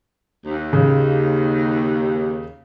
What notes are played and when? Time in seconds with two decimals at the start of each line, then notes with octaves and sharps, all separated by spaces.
0.46 D#2
0.73 C#3